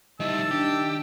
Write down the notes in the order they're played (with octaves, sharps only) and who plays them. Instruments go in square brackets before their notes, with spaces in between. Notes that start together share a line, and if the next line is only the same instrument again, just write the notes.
[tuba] D#3 [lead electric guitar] G3 E4 [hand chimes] D#5 [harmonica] A5 E6
[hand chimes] D4 [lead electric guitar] G4